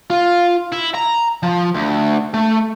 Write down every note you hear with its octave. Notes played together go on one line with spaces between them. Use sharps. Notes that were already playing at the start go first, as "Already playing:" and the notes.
F4
E4
A#5
F3
D2
A3